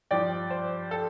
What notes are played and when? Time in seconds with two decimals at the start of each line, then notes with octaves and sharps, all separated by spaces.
0.11 G2 F3 D5 G5
0.50 C5
0.91 A4